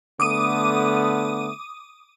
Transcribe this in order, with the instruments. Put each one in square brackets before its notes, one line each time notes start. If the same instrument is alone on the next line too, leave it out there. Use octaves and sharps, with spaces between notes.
[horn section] D3 A3 B3 [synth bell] D6 D#6 D#7